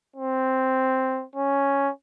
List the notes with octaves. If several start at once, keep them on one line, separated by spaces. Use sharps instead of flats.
C4
C#4